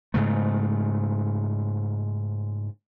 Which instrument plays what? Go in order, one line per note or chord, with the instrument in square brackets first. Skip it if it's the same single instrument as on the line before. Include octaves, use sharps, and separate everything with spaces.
[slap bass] G#2 C#3 A3